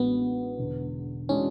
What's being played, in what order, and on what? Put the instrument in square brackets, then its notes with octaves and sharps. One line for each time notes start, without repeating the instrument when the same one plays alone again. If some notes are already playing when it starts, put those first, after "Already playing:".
Already playing: [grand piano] A1 A2 G#3 D4 F#4 [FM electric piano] B3
[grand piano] E1 E2 D3
[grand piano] E3 G#3 D4 F#4 [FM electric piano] C#4